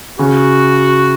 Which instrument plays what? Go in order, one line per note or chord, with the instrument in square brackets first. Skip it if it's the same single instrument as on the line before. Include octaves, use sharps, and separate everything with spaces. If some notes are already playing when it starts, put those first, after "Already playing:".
[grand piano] C#3 [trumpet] F#4